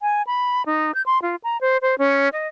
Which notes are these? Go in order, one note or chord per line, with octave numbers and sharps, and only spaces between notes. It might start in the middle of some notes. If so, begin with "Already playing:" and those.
G#5
B5
D#4
G6
C6
F4
A#5
C5
C5
C#4
D#5